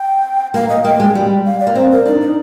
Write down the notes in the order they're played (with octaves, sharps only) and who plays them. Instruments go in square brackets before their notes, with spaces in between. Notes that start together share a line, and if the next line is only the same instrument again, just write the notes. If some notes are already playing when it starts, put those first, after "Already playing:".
Already playing: [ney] G5
[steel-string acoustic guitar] A#3 [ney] F5
[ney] D#5
[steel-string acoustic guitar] A#3 [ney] G5
[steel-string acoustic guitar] G#3
G3
[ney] F5
D5
[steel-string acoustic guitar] A#3
[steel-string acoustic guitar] C4 [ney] C5
[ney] A#4
[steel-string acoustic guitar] D4 [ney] D#4
[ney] D#4